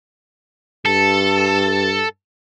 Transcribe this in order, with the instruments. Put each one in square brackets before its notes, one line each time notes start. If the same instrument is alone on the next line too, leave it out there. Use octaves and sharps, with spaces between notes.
[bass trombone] G2 [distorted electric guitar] A4